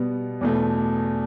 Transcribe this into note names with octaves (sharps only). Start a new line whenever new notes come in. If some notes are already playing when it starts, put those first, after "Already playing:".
Already playing: B2 G3 B3
E2 B2 A3